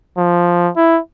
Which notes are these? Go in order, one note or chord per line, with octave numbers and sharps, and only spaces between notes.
F3
E4